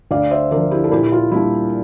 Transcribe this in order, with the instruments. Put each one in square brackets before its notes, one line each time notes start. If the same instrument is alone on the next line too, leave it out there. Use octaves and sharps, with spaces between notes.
[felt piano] D2 D5 F5
C5 E5
D3 F3 A#4 D5
E4 G4
A4
A#2 E4 G4
F4
G3 A#3 D4 E4